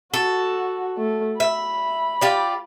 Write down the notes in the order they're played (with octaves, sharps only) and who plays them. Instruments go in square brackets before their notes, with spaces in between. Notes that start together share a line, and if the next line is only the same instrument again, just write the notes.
[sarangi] F#4 [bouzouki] A4
[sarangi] A3
[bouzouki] E5 [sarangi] B5
[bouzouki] F4 G4 D5